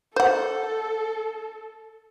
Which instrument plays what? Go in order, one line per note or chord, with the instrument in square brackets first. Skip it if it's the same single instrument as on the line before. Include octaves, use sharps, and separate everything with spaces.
[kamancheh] A4 [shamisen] C5 F#5